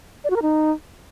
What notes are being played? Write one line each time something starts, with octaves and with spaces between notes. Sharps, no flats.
D5
F#4
A#4
D#4